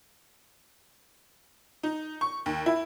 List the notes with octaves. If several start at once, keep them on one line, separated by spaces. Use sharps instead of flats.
D#4
C#6
D#2
E4